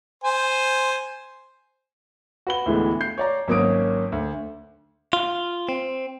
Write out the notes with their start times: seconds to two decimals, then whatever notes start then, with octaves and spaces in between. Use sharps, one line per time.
0.24 C5 G#5
2.47 F#4 B4 G7
2.66 D2 A2 E3 G#3 B3
3.01 G6 C7
3.18 C#5 D5 A#5
3.48 G#1 F#3 A#3 C#4 D#6 D7
4.12 D2
5.13 F4
5.69 C4